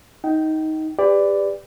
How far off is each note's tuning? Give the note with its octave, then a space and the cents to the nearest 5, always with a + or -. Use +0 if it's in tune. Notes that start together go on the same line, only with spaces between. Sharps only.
D#4 +15 G5 -25
G4 +30 B4 +25 D5 +0